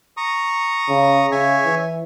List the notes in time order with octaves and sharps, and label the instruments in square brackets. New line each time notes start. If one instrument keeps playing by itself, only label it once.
[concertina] A#5 C#6 D#6
[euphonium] C#3
[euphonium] C#3 [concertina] C#5 E5 G#5
[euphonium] E3